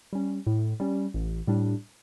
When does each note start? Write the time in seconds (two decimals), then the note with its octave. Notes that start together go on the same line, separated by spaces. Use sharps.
0.13 G3 C#4
0.47 A2
0.80 G3 C#4
1.14 A1
1.47 A2 G3 D4